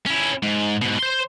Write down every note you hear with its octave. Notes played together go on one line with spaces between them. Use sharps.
C#4 E4
G#2
G#2 B2
C5 C6